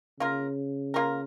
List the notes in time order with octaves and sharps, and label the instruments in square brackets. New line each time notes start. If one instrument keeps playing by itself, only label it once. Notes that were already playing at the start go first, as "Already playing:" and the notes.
[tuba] C#3 [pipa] A#3 F4 A#4
[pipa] A#3 F4 A#4